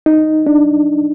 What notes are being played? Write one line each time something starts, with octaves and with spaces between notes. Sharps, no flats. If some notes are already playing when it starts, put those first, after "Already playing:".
D#4
D4